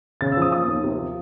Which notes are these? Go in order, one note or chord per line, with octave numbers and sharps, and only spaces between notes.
C#3 A6
E6
F3 D#6
A#3 D#6
D#2
C3
F3